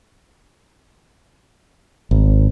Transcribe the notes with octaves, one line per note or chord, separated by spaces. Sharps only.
G#1